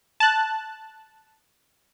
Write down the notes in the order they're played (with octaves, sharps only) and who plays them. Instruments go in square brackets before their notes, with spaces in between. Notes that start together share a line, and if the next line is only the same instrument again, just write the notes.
[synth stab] A5 F#6